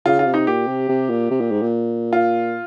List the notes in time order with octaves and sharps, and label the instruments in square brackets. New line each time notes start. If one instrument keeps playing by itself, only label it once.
[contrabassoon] C#3 [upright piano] F4
[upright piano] F4
[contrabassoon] C3
[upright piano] D#4
[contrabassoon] A#2 [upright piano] G4
[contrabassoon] C3
C3
A#2
C3
A#2
G#2
A#2
[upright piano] F4